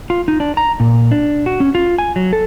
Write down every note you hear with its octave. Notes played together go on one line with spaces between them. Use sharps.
F4
D#4
D4
A#5
A#2
D4
F#4
C#4
F4
G#5
F#3
A4